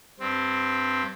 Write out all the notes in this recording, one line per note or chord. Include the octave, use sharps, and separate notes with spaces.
G2 C4